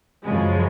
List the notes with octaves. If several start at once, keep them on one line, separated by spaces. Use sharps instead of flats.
F#2 C#3 F3 G#3